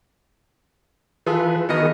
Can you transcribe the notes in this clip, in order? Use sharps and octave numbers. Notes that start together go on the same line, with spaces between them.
E3 F4 G#4 A4 B4
D#3 B3 F#4 G#4 A#4 D#5